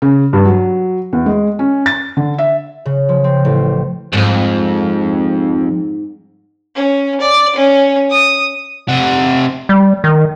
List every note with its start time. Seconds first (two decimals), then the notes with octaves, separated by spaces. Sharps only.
0.02 C#3
0.33 G2
0.45 F#3
1.13 E2
1.26 G#3
1.59 C#4
1.86 A6
2.17 D3
2.38 E5
2.85 C#3
3.09 F3
3.24 C4
3.45 A1
4.13 C2 F2 G#2
6.76 C#4
7.21 D5
7.56 C#4
8.10 D#6
8.89 C3 F#5
9.69 G3
10.04 D#3